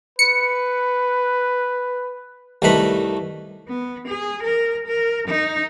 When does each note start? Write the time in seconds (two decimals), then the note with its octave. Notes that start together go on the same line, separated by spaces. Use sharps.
0.19 B4 C#7
2.62 C2 D#3 A3 B4 B5
3.68 B3
4.08 G#4
4.43 A#4
4.87 A#4
5.28 D#4